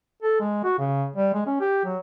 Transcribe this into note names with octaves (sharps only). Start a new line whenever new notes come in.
A4
G#3
F#4
C#3
G3
G#3
C#4
G4
F#3